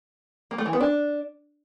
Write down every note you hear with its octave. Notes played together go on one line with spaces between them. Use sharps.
A#3
A3
E3
B3
D4